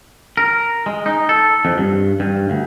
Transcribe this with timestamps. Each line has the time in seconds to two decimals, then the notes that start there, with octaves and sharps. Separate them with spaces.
0.37 A#4
0.86 G#3
1.06 D#4
1.29 A4
1.65 F2
1.77 G2
2.20 G2
2.50 D2